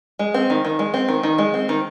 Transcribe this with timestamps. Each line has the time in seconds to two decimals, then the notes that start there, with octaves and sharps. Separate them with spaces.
0.19 G#3
0.34 C4
0.50 D#3
0.65 D#3
0.79 G#3
0.94 C4
1.08 D#3
1.23 D#3
1.38 G#3
1.54 C4
1.69 D#3